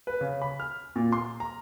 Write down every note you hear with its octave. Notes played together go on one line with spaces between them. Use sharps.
B4
C#3
B5
F6
A#2
C6
A#5